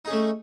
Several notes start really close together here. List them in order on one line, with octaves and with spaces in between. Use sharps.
D#4 G#4 C#4 A3